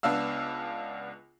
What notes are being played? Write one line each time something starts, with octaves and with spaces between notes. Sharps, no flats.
C#2 B3 D4 F5 E6